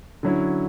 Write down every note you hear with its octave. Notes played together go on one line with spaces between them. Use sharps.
D3 F#3 C#4 E4